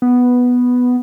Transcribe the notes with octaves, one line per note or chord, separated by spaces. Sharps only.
B3